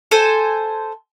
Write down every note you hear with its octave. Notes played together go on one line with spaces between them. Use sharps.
A4 C5 G#5